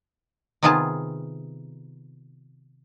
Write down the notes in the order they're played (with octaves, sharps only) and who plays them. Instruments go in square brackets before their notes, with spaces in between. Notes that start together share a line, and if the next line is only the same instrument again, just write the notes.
[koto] C3 D#3 B3 F4 G#4 A5